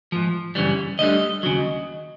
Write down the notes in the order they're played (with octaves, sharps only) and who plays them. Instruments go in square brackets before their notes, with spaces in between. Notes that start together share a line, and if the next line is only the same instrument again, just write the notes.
[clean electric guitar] G#2 F3
F#2 C#3 E3 G3
D2 D3 G3 D#5
D#2 C#3 F#3